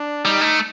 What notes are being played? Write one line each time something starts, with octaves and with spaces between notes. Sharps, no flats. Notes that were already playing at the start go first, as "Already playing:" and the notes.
Already playing: D4
G3 D#4
A3